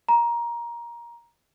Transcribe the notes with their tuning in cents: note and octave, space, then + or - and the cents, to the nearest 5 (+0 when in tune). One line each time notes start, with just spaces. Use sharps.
A#5 +15